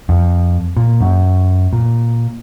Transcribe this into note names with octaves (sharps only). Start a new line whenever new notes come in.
F2
A#2
F#2
A#2